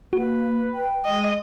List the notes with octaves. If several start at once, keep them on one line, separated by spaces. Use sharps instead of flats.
A#3 F#4 B4
G5
G#3 D#5